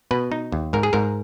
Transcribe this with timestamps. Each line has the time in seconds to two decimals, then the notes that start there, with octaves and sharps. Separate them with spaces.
0.11 B2 B4
0.32 D#4
0.52 D#2
0.73 G#2 A#4
0.83 G#4
0.93 G#2 A#4